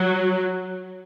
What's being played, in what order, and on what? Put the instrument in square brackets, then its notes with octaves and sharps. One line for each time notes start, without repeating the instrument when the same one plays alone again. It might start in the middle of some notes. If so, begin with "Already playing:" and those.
Already playing: [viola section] F#3